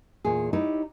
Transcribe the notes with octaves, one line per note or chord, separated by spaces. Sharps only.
E2 A#2 G#4
D#4 E4 G4 C#5 D5